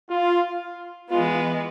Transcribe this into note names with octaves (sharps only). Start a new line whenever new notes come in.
F4
E3 G#3 B3 F4